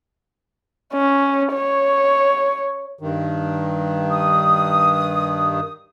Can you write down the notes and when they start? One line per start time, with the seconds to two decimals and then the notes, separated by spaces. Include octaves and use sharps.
0.94 C#4
1.53 C#5
2.99 G2 D#3
4.11 D#6